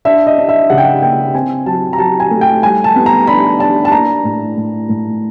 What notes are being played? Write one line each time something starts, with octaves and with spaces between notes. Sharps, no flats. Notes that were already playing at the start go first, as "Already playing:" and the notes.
D4 E5
D#5
D4
E5
C#3 F#5
G5
F#5
A#3 G5
C4 G#5
F#3 A5
A#5
F#3 A5
G#5
A3
G5
G3 G#5
A5
B3
A#5
D4 B5
D4 A5
A5
A#3 A#5
A2
A2
A2